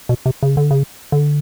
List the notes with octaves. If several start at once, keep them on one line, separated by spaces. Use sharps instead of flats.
B2
C3
C#3
D3
C#3
D3